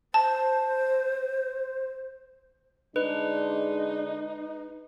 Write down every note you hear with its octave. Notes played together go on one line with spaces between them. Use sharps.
C5 A5
D3 G#3 D4 D#4 B4